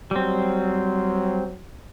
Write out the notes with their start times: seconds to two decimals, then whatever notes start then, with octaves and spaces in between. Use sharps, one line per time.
0.11 F#3 G3 C4